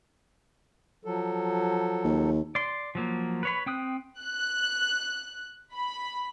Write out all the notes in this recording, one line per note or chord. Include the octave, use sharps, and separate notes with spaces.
F3 F#3 A4
D#2
D5 C6
F3 F#3 A#3
B4 C#5 B5
C4 G5 D#6 F#6
F#6
B5